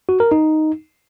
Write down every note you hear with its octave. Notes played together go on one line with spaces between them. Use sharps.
F#4
A#4
D#4